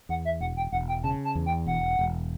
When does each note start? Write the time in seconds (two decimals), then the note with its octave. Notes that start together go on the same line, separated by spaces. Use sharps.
0.09 E2 F#5
0.25 E5
0.40 E1 F#5
0.57 G5
0.72 E1 F#5
0.88 G5
1.03 C#3 A5
1.25 A5
1.35 E2
1.46 G5
1.66 E1 F#5
1.99 E1